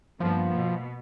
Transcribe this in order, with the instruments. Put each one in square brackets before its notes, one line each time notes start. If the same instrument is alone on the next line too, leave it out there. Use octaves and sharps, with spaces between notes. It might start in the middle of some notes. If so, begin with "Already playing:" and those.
[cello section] G2 A#3 B3 [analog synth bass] F3
[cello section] B2